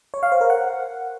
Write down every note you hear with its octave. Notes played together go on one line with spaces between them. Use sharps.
C#5
F5
C5
A#4
F#5